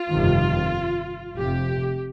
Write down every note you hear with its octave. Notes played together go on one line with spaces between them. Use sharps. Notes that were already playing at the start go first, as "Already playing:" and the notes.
Already playing: F4
G1 F2 C3 D#3
F1 F2 C3 G4